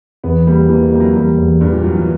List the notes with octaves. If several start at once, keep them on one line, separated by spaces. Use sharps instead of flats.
E2 B3
G3 A#3
E3 A#3
G3 A#3
F#3
E2 G3
E2
E2 G2
A#2
E2 F#3
E3